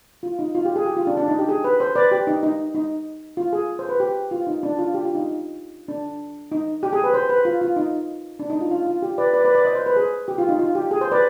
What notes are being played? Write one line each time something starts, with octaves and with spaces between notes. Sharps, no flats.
F4
D#4
F4
G4
G#4
G4
F4
D4
D4
D#4
G4
G#4
B4
C5
B4 D5
G4
D#4
D#4
D#4
F4
G#4
C5
B4
G4
F4
D#4
D4
F4
G4
F4
D#4
D4
D#4
G4
G#4
B4
C5
B4
F4
F4
D#4
D4
D#4
F4
F4
F4
G4
B4 D5
B4 D5
B4 D5
B4 D5
C5 D#5
C5
B4
G#4
G4
F4
D#4
F4
G4
G#4
C5
B4 D5